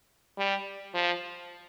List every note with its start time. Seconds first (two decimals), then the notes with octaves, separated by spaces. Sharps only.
0.38 G3
0.94 F3